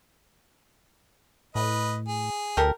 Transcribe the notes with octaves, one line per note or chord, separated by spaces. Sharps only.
A2 B4 D#5
G#4
D2 G4 A4 A#4